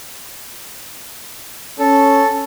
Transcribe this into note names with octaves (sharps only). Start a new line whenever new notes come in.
C#4 A4